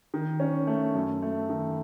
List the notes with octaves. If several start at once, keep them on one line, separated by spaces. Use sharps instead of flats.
D#3
C#4
A3
F#2
A3
D#3